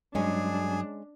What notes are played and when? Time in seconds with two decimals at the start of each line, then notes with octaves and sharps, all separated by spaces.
0.15 G2 F#3 G#3 C#4 D4 G#4